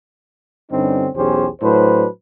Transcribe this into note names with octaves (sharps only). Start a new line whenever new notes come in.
G2 D3 G3 C4 C#4 D#4
B1 E2 C#4 G4 G#4 C5
A2 F#3 D4 B4 C5